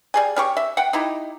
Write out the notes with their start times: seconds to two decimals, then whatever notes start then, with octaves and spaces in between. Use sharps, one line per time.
0.14 G3 G#4 G#5
0.36 C#4 G4 C#6
0.57 E5
0.77 F#5 G5
0.93 D#4 E4 G4